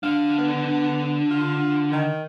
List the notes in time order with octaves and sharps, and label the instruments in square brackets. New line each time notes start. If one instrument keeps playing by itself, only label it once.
[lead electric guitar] D3 D4 [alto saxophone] F5
[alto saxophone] B3
F4
D#3